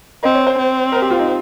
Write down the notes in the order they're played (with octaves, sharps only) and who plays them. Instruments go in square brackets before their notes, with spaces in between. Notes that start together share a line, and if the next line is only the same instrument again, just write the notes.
[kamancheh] C4 [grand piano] D#5
[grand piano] C#5
C5
[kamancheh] C4
[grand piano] A#4
G4
F4
D#4